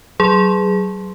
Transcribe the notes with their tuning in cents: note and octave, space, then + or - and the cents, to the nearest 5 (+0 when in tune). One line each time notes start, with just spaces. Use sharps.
F#3 +35 G#4 +0 C6 +0